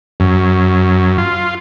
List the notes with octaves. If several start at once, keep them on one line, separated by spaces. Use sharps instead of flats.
F#2
F4